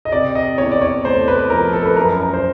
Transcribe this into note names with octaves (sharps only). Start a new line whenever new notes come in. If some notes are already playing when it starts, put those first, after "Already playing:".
D#5
C3 D5
D#5
E2 C#5
D5
C#5
A3 C5
B4
F3 A#4
A4
B4
F#2 A#4
A#4
C5